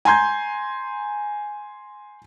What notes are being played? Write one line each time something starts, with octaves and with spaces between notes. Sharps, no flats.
G#5 A#5 C6 G6 G#6